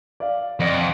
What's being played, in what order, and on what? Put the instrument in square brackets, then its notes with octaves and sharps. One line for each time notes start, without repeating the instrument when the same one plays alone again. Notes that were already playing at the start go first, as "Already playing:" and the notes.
[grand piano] D5 F5
[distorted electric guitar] F2 [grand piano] D5 D#5 F#5